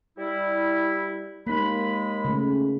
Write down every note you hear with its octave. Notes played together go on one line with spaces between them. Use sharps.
G3 E4
D#2 G#3 A#3 D#4 B5
C#3 A3